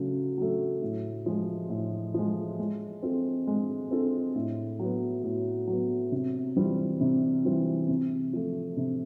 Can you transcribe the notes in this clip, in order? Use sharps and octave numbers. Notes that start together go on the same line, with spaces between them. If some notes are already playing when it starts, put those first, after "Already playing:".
Already playing: C#3 F#3 A3
F#3 A3
A2
F3 G#3
A2
F3 G#3
G#3
C4 F4 A4
G#3
C4 F4 A4
A2
F#3 B3
A2
F#3 B3
C3
E3 G3 C4 F4
C3
E3 G3 C4 F4
C3
F3 A3
C3